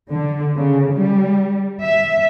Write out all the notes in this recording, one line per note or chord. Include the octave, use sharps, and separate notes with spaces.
D3
C#3
G3
E5